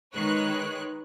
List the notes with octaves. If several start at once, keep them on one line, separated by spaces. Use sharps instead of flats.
D#3 G#3 B4 C#5 F#6